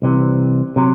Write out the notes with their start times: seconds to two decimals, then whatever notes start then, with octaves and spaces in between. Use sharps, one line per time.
0.02 C2 C3 E3
0.76 C3 F#3